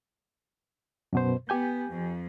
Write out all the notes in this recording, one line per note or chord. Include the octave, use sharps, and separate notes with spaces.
F#2 B2 C5
B3 G4 G#5 G6
F2